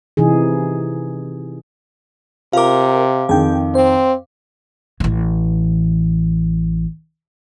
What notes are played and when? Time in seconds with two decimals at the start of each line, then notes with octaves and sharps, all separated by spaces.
0.17 C3 E3 D#4 G#4
2.53 C3 F4 A#4 F5 D6
3.29 F2 D#3 G#4 G5
3.75 C4 C5
5.00 A1 E3